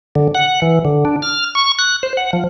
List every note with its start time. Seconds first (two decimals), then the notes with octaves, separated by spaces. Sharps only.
0.15 D3
0.35 F#5
0.62 E3
0.85 D3
1.05 D4
1.22 F6
1.55 C#6
1.79 F#6
2.03 C5
2.17 F#5
2.33 F3